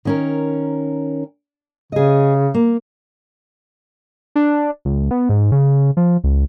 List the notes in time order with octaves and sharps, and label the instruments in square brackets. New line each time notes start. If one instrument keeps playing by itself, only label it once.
[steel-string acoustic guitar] D#3 C#4 A#4
[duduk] C#3 [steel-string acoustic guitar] G#4 D#5
[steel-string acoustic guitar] A#3
[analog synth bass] D4
C#2
B3
G#2
C#3
F3
C#2